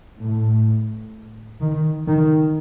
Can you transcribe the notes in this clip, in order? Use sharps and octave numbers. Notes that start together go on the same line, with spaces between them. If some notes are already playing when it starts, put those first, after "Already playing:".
A2
D#3
D#3